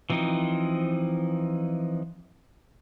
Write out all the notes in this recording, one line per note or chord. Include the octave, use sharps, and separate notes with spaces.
E3 F3 C4 D#4